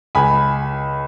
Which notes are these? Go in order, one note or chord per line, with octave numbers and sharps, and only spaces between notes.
C#2 G#5 B5